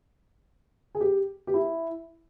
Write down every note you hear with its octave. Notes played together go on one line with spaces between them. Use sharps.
G#4
G4
G4
E4